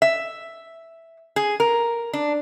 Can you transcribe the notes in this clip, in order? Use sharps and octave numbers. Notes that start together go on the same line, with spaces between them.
E5
G#4
A#4
D4